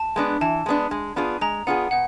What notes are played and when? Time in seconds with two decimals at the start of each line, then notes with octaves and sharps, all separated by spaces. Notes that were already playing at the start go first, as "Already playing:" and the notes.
Already playing: A5
0.16 G#3 B3 D4
0.41 E3 A5
0.66 G#3 B3 D4
0.91 G#3
1.16 B3 D4 F4 G#4
1.41 G#3 A#5
1.67 B3 D4 F4 G#4 F#5
1.91 B2 F#5